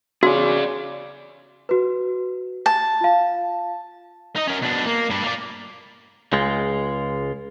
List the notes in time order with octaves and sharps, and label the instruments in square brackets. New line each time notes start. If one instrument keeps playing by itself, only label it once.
[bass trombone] C#3 [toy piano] F#4 [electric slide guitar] G#4 D5
[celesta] F#4 B4
[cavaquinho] A5
[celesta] F4 F5
[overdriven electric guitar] D#4 D#5
C#4 A#4
B2 D4
A#3
G3 D4
A#3 D5
[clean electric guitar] C#2 G#3 F4